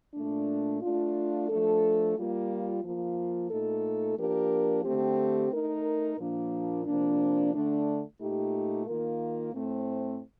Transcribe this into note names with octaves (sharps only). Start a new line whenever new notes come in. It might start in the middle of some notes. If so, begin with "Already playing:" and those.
A#2 A3 D4
A3 D4 F4
F3 A3 D4 A4
G3 A#3 F4
F3 A#3 F4
A#2 A3 D#4 A4
F3 A#3 D4 G4 A#4
D3 A3 C4 G4
A3 D#4 A#4
A#2 F3 A#3 D4
C3 F3 A#3 D4
D3 A3 D4
A#2 A3 D#4 G4
D#3 A#3 F4 A#4
A2 A3 C4